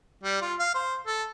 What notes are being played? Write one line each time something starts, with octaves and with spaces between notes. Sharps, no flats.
G3
F4
F5
C5
A4